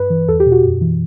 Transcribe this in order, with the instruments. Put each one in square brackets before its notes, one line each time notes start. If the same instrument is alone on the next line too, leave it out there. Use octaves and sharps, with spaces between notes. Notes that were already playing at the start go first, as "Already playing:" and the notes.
Already playing: [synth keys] G2 B4
E3
E2 A4
G4
B2
F#4
F#2
E3